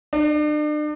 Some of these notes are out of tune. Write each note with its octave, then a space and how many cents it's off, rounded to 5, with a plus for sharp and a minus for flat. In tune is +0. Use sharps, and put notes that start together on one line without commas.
D4 +40